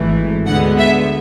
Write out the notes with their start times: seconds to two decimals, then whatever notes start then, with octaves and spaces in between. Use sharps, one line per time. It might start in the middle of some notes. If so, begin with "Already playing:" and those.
Already playing: G#1 G#2 E3 A3
0.46 D2 D3 G#3 B3 F#5
0.79 E5